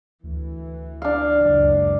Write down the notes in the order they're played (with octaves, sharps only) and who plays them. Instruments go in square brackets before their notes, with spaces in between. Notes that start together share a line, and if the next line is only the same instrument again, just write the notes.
[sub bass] D2 [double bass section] E3
[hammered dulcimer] D4 F5
[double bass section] F#1 C#2